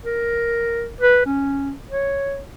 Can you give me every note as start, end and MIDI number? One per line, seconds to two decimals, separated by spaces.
0.04 0.88 70
1.01 1.21 71
1.25 1.72 61
1.90 2.41 73